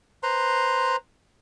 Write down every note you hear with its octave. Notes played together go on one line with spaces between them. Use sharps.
B4 C5 A#5 C6